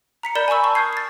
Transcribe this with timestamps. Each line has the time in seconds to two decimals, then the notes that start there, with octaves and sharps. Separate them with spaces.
0.23 A#5 B6 C#7
0.35 A#4 D5 B5 G6 E7 G7
0.48 G#5 A#5 B5 C#6 E6
0.64 A5 C#6
0.75 D#6 F6 G6 G#6 C7
0.93 A6 C7